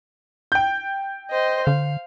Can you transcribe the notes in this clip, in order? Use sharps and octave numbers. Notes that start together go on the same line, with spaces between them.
G5 G6
C5 D#5
D3 F5